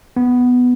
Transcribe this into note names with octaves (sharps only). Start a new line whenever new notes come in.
B3